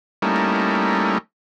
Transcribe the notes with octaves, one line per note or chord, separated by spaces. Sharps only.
G3 A3 A#3 C#4 D#4 E4